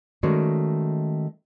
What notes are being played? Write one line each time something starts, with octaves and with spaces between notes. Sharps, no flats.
D#3 G#3 A3 C#4 F#4 D5